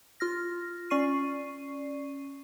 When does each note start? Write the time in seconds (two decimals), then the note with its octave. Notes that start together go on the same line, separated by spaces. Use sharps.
0.20 F4 F6 A#6
0.90 C#4 D5 C#6 C7 D#7